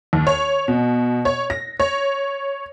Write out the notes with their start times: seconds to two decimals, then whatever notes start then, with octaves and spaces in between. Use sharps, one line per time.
0.13 D#2
0.27 C#5
0.68 B2
1.25 C#5
1.50 A#6
1.80 C#5